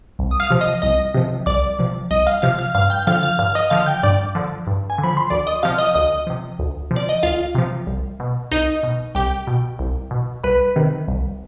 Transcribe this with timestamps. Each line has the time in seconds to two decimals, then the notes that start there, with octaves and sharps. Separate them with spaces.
0.19 C2
0.31 D#6
0.40 F5 F6
0.50 C3 F3
0.61 D#5 D#6
0.82 C2 D#5 D#6
1.14 C3 F3
1.46 C2 D5 D6
1.79 C3 F3
2.11 C2 D#5 D#6
2.27 F5 F6
2.42 C3 F3 F5 F6
2.59 F5 F6
2.75 G2 F5 F6
2.90 G5 G6
3.07 D3 F3 F5 F6
3.23 F5 F6
3.39 G2 F5 F6
3.55 D#5 D#6
3.70 D3 F3 F5 F6
3.86 G5 G6
4.03 G2 D5 D6
4.35 D3 F3
4.67 G2
4.90 G#5
4.98 D3
5.03 F3 B5
5.17 C6
5.30 D2 D5 D6
5.47 D#5 D#6
5.63 C3 F3 F5 F6
5.78 D#5 D#6
5.95 D2 D#5 D#6
6.27 C3 F3
6.59 D2
6.91 C3 F3
6.96 D5
7.09 D#5
7.23 D2 F4 F5
7.55 C3 F3
7.87 C2
8.20 B2
8.51 C2 D#4 D#5
8.83 B2
9.15 C2 G4 G5
9.47 B2
9.79 C2
10.11 B2
10.44 C2 B4 B5
10.76 C3 D#3
11.08 C2